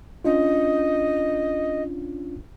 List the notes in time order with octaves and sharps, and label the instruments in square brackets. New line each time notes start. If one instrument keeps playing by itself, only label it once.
[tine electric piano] C#4 D4 F4 [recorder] D#5